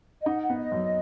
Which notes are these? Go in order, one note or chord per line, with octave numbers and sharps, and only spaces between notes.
D#5
D#4 F#5
F#5
B3
D#5
F#2